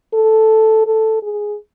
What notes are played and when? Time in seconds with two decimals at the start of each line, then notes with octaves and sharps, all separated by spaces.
0.14 A4
0.87 A4
1.23 G#4